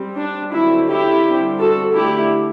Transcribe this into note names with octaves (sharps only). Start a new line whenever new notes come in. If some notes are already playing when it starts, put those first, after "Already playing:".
Already playing: G3 C4
D4
D3 F#3 C4 E4
E4 G4
D3 G3 C4
F#4 A4
D3 A3 D4 E4 G4